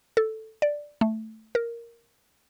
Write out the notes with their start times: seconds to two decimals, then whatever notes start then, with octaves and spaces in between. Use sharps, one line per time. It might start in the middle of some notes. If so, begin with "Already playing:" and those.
0.17 A4
0.62 D5
1.01 A3
1.55 A#4